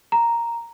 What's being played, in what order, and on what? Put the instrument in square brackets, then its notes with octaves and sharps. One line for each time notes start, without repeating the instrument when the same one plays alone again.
[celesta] A#5